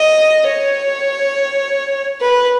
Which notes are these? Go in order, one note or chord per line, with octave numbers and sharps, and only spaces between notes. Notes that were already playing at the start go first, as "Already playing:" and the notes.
Already playing: D#5
C#5
B4